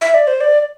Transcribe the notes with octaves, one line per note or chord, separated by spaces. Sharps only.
E5
D5
C5
D5